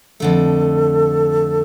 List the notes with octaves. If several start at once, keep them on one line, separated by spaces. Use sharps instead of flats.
F2 D3 A3 A4